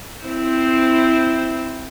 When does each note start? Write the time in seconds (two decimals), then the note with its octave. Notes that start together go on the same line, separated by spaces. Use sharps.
0.23 C4 E4 C5